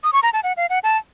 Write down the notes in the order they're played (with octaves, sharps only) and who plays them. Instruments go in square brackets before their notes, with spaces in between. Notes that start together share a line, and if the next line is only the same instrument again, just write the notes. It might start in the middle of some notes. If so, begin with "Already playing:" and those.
[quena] D#6
C#6
A#5
A5
F#5
F5
F#5
A5